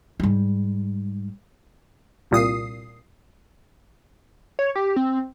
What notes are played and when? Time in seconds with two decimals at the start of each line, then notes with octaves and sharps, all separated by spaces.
0.20 G#2 G3
2.31 C2 A#2 D#6 C7
4.59 C#5
4.75 G4
4.96 C4